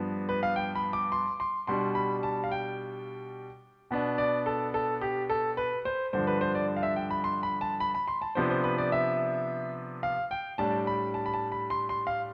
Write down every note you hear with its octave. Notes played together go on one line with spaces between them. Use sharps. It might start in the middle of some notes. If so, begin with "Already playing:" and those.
Already playing: G2 F3 B3 D4
B4
F5
G5
B5
D6
C6
C6
B2 G3 D4 C6
B5
A5
F5
G5
B2 B3 D4
D5
A4
A4
G4
A4
B4
C5
G2 D3 F3 C5
B4
C5
D5
F5
E5
G5
B5
C6
B5
A5
B5
B5
C6
A5
C3 F3 B3 D4 C5
C5
B4
D5
E5
F5
G5
A2 G3 D4 A5
B5
A5
B5
A5
B5
C6
C6
F5